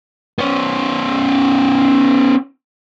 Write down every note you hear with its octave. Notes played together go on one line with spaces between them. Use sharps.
B3 C#4